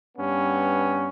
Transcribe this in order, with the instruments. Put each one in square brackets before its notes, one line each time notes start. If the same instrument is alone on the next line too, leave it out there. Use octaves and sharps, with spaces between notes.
[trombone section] G2 B3 C#4